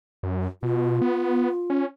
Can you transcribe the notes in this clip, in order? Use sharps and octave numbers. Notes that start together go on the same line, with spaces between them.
F#2
B2 F4
B3
C#4